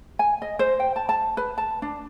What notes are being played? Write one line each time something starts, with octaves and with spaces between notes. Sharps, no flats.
G#5
D#5
C5
G5
A5
A5
B4
A5
D4